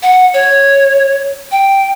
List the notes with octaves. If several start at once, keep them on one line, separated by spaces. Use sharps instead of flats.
F#5
C#5
G5